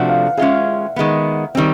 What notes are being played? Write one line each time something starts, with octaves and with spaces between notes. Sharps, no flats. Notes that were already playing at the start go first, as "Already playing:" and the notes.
Already playing: C3 F3 A3 D4 F#4 F#5
F5
G#3 C#4 F4 G#4 E5
D#3 G#3 B3
D#3 G3 C4